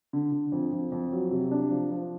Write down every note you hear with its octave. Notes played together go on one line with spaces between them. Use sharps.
D3
D3
F2
F2
F2
F#3
C3
D4
F3
F3